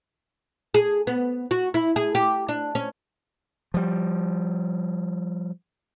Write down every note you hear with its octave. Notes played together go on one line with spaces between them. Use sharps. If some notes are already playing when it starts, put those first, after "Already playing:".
G#4
B3
F#4
E4
G#4
G4
D4
C#4
F3 G3